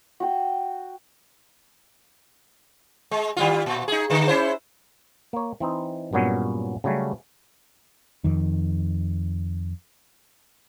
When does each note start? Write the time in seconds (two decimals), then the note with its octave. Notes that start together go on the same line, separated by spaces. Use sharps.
0.20 F#4 G5
3.11 G#3
3.37 D#3 G3 F4
3.66 A#2
3.88 D#4 G#4
4.10 D3 G#3
4.28 C#4 E4 C5
5.33 A#3 C#5
5.60 E3 C4 D#4
6.13 G2 A#2 F#3 B3 C#4
6.84 C#3 F#3 G3 A3 C#4
8.24 F2 D#3